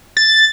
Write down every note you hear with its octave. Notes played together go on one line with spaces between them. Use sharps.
A6